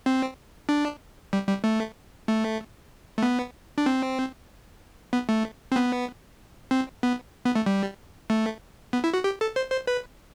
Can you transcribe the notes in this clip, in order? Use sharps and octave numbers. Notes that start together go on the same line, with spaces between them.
C4
D4
G3
G3
A3
A3
A3
B3
D4
C4
B3
A3
C4
B3
C4
B3
B3
A3
G3
A3
B3
E4
F#4
G4
A4
C5
C5
B4